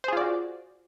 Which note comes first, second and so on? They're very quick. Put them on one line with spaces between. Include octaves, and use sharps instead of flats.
C5 G#4 F4 D5 F#4